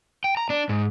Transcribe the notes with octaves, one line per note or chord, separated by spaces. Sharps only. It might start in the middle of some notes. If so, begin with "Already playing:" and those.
G5
A#5
D4
G#2